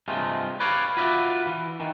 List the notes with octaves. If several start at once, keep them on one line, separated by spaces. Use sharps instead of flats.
G2 C3 G#3 A3 F4
B4 C#5 D5 F5
F4 F#4 B4 D5 E5 F5
E3
D#3 E3